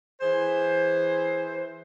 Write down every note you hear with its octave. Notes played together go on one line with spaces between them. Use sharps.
E3 G#4 C5